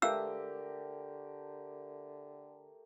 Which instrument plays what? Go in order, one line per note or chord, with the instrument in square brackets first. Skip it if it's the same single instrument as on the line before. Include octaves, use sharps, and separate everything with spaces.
[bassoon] D3 [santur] A3 G4 A#4 [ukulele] B4 E5 F5 [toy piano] E6